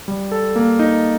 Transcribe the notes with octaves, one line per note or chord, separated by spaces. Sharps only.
G3
A4
A#3
D#4